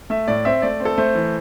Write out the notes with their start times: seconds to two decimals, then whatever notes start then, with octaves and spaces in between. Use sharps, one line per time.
0.10 A3 E5
0.28 A2 D5
0.45 C4 E5
0.62 A3 D5
0.80 C4
0.85 A4
0.98 A3 C5
1.15 E3